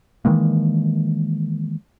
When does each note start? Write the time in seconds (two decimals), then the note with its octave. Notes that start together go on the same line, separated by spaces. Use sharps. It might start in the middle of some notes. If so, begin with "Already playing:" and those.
0.25 D#3 E3 G#3 A#3